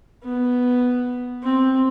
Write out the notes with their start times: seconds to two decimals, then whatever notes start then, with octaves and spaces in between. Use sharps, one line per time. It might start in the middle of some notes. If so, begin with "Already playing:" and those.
0.24 B3
1.43 C4